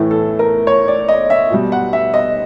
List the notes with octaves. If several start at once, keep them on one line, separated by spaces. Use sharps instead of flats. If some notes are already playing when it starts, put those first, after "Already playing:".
Already playing: A2 E3 A3
A4
A#4
C#5
D5
D#5
E5
B2 G3
F#5
E5
D#5